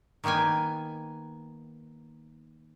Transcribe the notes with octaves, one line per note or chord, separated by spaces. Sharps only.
D#3 A#3 B3 G5 G#5